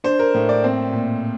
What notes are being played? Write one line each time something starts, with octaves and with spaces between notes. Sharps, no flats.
D4 C5
A#4
A2
D5
C4
A#2